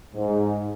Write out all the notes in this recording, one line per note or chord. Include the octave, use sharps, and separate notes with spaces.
G#2